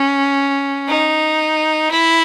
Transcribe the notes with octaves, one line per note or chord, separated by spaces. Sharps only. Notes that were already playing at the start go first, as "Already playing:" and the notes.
Already playing: C#4
D#4
E4